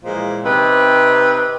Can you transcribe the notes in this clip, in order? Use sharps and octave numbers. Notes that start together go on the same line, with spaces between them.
A#2 E3 F3 G#3
C3 C4 D#4 B4